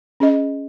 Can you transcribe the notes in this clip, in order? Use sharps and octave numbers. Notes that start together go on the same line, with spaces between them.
C#4 G#4 D#5